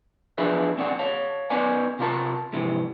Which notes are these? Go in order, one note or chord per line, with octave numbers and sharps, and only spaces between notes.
E2 F3 D4 G#4 B4 E5
C4 C#4 D5 F#5
C#5 F5 A5
B3 C#4 D#4 B4 D5 G#5
C3 F4 A#4 C#5 A5
F2 G#2 C3 E3